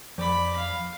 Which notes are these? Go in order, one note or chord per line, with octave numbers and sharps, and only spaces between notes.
F2 D5 B5
F5